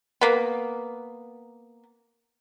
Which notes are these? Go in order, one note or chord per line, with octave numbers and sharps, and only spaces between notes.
A#3 B3